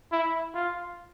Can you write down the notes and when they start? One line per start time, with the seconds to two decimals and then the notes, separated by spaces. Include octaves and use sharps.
0.12 E4
0.55 F4